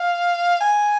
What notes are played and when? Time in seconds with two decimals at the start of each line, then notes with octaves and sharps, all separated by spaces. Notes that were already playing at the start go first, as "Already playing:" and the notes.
Already playing: F5
0.61 G#5